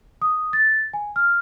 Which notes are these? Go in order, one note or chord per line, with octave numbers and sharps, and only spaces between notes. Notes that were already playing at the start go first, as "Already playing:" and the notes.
D#6
A6
G#5
F6